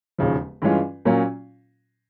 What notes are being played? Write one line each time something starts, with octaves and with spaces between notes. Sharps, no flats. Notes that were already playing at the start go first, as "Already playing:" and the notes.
E1 D#2 C#3 F3
G2 E3 G#3 C#4 F4
A#2 F#3 A#3 C#4 F4